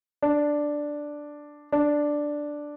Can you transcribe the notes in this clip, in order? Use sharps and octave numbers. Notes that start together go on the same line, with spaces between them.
D4
D4